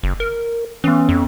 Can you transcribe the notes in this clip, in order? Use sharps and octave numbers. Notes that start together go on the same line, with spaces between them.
F#1
A#4
E3 B3 C#4
F2